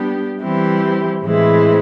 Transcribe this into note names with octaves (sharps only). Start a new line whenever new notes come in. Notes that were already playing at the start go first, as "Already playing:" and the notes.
Already playing: G3 B3 D4 G4
E3 G3 C4 E4 G4
A2 E3 G#3 C4 E4